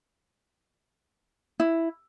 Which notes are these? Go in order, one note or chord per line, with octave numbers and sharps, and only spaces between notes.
E4